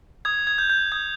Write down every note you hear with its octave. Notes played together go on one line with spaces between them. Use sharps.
D#6 G#6
G#6
G6
G6
D#6 G#6